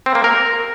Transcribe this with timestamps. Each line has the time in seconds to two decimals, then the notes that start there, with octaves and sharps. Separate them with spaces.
0.06 C4
0.15 A#3
0.24 A#4